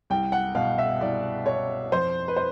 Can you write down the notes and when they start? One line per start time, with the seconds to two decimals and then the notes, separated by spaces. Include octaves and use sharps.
0.10 C2 G5
0.32 F#5
0.55 B2 F5
0.78 E5
1.01 C2 D5
1.46 B2 C#5
1.92 F2 C5
2.28 B4
2.37 C5